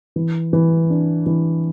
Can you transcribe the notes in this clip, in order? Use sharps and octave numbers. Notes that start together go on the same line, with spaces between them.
E3
E3
D4
E3